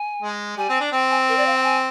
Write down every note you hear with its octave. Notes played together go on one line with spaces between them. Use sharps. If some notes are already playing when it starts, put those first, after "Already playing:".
Already playing: G#5
G#3
G3 G#5
C4
D4
C4 G5
G#5
A#4
D5
F5
G5
G#5